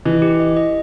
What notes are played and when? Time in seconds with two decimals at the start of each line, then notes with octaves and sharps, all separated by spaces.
0.05 E3 D#5
0.22 G4
0.40 D#5
0.56 D#5